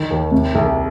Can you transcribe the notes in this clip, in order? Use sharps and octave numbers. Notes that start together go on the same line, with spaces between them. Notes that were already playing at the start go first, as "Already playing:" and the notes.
Already playing: D#3
D#2
C3
C2